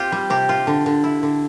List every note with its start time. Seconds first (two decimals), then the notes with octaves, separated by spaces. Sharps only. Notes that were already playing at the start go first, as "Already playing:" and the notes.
Already playing: C4 F4 G4
0.12 G3
0.30 C3 G4
0.49 F4
0.67 D3
0.86 D3
1.04 E4
1.23 D3